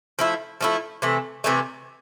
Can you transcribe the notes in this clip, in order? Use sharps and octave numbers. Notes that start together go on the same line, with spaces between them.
F3 A3 E4
F3 A3 E4
C3 E3 A3
C3 E3 A3